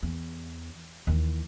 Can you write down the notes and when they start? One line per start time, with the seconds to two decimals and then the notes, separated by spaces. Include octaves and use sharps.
0.03 E2
1.07 D#2 E3